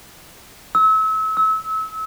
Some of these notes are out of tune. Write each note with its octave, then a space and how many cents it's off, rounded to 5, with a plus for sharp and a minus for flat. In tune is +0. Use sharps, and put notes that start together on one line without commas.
E6 -35
E6 -30